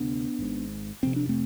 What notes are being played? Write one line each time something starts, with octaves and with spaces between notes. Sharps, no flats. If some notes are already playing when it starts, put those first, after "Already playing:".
Already playing: D2 C3 B3 D4
G#1 G#2
F1 F2 C3 C4
D4
A3 C4